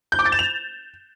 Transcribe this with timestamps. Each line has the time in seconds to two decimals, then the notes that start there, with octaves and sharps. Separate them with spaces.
0.12 G6
0.19 D6
0.25 A6
0.32 E7
0.39 F7